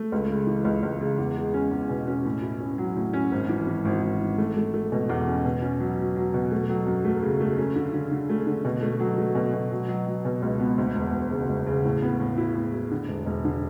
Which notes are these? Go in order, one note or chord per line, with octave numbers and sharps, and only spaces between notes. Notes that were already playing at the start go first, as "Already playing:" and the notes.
Already playing: A3
C#2
C#3
E3
C#2
C#2
C#3
E2
G#3
C#4
E2
B2
C#4
A2
E4
C#4
F#3
A2
C#4
G#1
E3
E3
G#1
G#1
E3
A3
A3
A3
B2
E2
C#4
B2
C#4
F#3
F#3
F#3
B2
A3
F#3
F#2
A3
C#3
A3
C#4
D3
D3
D3
A3
D3
B2
A3
F#3
A3
B2
B2
F#3
F#3
F#3
B2
C#2
B3
D2
E1
E1
C#3
E1
C#3
A2
B3
A2
E4
A2
E4
D3
E1
E1
D3